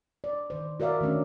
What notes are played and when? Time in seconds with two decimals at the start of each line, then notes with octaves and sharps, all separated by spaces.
0.24 D5
0.50 D#3 C5
0.80 F#4 A#4 D5 E5 F5
1.01 D#3 A3 C#4 D4